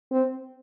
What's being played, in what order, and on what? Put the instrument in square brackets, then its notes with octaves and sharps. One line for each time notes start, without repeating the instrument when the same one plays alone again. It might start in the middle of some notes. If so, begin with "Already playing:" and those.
[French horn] C4